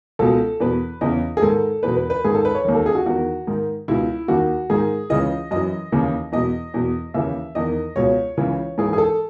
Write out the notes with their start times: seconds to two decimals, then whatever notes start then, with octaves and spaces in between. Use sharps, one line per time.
0.19 C#2 B2 A4
0.60 E2 B2 B4
1.01 E2 C#3 E3 D#5
1.37 G#4
1.42 G#2 D#3 A4
1.83 E2 B2 B4
1.97 B4
2.10 B4
2.24 G#2 D#3 G#4
2.35 A4
2.45 B4
2.55 C#5
2.65 D#2 D#3
2.75 A4
2.86 G#4
2.95 F#4
3.06 E2 D#3 F#4
3.47 G#2 D#3
3.88 C#2 B2 E4
4.28 D#2 D#3 F#4
4.70 G#2 D#3 G#4
5.10 C#2 C#3 E3 D#5
5.51 F#2 E3 D#5
5.92 D#2 C#3 E3
6.32 E2 B2 D#5
6.74 E2 B2
7.14 D#2 C#3 E3 E5
7.55 E2 D#3 D#5
7.96 C#2 B2 C#5
8.38 C#2 C#3 E3
8.78 G#2 E3 G#4
8.93 G#4
8.98 A4